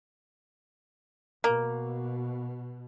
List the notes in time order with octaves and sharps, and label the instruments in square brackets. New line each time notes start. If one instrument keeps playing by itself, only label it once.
[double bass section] B2 [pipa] A#3